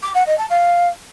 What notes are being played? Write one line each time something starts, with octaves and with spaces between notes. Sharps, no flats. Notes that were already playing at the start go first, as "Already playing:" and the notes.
D6
F#5
D#5
A5
F5